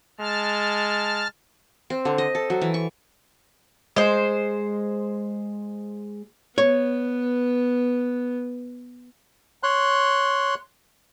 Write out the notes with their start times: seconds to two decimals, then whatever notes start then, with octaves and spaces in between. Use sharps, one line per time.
0.20 G#3 A5 F6
1.90 C4
2.05 D3
2.18 D#5
2.35 A4
2.50 F#3
2.62 E3
2.74 C#6
3.96 G#3 C5
6.58 B3 B4 C#5
9.63 C#5 C6 F#6